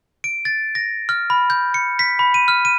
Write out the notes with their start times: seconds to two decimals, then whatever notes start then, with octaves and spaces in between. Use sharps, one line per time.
0.24 D7
0.45 A6
0.75 A#6
1.09 F6
1.30 B5
1.50 G6
1.74 C#7
1.99 B6
2.19 B5
2.34 D#7
2.48 F6
2.65 D#7